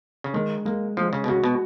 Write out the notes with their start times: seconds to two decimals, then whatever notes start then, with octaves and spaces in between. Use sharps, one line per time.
0.24 C#3
0.34 D#3 G#3
0.65 G#3 A#3
0.97 F3 G#3
1.13 C#3
1.24 B2
1.28 C#3 F#4
1.44 B2